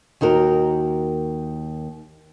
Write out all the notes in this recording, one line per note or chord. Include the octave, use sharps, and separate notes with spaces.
D#2 D#4 F#4 A#4